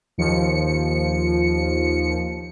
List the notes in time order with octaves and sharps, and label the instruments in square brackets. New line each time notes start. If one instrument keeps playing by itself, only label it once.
[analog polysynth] D#2 F3 C#7